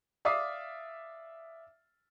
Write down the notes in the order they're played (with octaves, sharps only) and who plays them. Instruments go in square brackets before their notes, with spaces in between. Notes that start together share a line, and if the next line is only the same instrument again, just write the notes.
[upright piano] D5 E5 F5 D6 D#6 C7